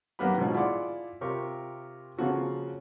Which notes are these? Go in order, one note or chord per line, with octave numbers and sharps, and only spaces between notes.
F#2 D#3 A#3 B3 G4 B5
G#2 B2 D3 F3 F#4
E4 F4 G#4 D5 F#5 C6
C3 F4 G4 A#4 C#6
C#3 F3 A#3 F#4 A4